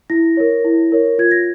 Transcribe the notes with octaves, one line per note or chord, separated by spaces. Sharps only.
E4 A#6
A#4 C#5
E4
A#4 C#5
F4 G#6
A#6